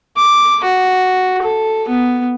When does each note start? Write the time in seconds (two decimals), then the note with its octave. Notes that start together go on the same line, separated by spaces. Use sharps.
0.16 D6
0.64 F#4
1.42 A4
1.88 B3